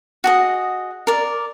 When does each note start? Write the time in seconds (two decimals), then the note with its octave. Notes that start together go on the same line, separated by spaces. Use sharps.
0.24 F#4 G#4 D#5
1.07 A#4 D5